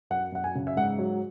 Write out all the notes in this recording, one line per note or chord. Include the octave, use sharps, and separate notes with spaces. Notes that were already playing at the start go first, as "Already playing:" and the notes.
F#2 F#5
F#2 F#5
G#5
C#3
E5
G#2 F#5
F#3